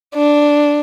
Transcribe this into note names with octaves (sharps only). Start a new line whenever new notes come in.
D4